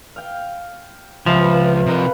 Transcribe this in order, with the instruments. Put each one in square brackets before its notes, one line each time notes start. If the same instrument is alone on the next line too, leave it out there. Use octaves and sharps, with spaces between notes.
[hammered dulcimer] F5 G5
[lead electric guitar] C#2 [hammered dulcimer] C3 E3 F5 [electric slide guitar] F3
[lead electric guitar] C3 A#4 [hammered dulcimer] B4 D#5 F5